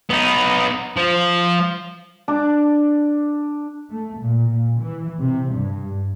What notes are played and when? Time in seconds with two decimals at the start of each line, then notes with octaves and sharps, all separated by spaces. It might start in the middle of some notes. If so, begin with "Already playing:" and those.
0.10 B3 D#4
0.97 F3
2.28 D4 A5 D6
3.91 A3
4.20 A#2
4.50 A#2
4.82 E3
5.21 C3
5.54 G2